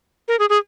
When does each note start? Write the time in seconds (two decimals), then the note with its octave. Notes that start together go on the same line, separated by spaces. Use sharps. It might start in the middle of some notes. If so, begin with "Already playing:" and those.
0.28 A#4
0.39 G#4
0.50 G#4